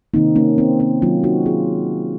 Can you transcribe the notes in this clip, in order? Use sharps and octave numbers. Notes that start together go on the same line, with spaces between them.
C3 D#3 A#3 C4 D#4
A#3 C#4
C4
C4
D#3 F#3 A#3 C#4 F4
D#4 F#4
F4 G#4